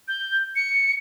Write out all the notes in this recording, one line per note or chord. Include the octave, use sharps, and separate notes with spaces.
G6
C#7